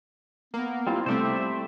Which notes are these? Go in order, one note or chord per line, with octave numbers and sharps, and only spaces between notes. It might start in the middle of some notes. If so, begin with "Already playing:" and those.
A#3 B3
G3 C4 E4 F4
C3 G3 A3 C4 C5 D5 E5